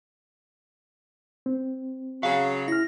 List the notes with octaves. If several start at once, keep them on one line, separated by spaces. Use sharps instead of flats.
C4
C#3 F#3 F5
E4 F6 A#6